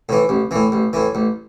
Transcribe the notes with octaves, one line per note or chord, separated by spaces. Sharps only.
A2 E3
A1
A2 E3
A1
A2 E3
A1